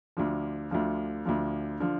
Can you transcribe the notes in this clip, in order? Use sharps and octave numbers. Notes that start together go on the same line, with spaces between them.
D2 D3 F3
D2 D3 F3
D2 D3 F3
D3 F3